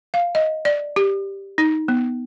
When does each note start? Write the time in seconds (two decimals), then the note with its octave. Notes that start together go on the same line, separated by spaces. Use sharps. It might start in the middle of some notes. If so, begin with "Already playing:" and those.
0.14 F5
0.35 D#5
0.65 D5
0.96 G4
1.58 D#4
1.88 B3